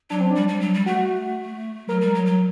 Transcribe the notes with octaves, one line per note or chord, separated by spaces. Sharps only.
F#3 D4
C4
G3 D4
G3
F#3
G3
A3 F#4
F#3 A#4
G3
F#3
F#3